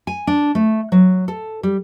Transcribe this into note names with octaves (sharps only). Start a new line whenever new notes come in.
G#5
D4
A3
F#3
A4
G3